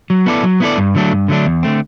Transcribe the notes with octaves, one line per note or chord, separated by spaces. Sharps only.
F#3
B3 E4 A4 D5
F#3
B3 E4 A4 D5
G2
D3 F#3 A3 D4
G2
D3 F#3 A3 D4
E2
D3 A3 C4